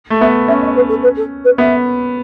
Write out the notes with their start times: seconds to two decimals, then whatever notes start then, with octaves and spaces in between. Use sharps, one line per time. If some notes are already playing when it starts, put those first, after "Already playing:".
0.10 A3
0.20 B3 E5
0.48 C#4 E5
0.62 D#5
0.76 B4
0.89 A4
1.03 B4
1.17 A4
1.45 B4
1.58 B3 E5